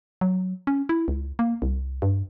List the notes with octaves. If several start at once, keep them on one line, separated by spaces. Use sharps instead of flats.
F#3
C#4
E4
C#2
A#3
C2
G2